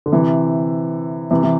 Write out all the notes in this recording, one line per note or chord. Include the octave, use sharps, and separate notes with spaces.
D3
C3 E3
C3 E3
E3